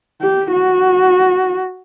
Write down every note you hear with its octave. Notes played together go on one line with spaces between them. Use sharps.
G4
F#4